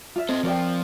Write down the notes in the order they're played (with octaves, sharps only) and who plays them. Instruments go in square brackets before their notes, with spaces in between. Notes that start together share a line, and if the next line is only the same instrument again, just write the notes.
[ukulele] F4 E5
[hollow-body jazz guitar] C4 [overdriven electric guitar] A4 D#5
[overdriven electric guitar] F3 [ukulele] A#4 D5 G5